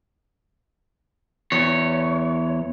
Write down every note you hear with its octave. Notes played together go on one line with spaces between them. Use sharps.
E2 C#5